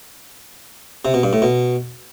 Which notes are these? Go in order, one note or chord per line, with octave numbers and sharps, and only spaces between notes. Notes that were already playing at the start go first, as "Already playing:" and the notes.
C3
B2
G2
A2
B2